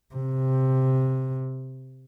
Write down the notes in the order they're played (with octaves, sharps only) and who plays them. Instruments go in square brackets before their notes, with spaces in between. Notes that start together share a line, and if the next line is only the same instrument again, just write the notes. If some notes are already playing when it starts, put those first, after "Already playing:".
[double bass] C3